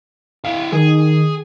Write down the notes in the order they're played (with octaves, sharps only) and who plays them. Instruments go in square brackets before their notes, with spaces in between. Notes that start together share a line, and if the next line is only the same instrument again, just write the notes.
[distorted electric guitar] E4 F5
[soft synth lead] D#3 [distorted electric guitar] G#4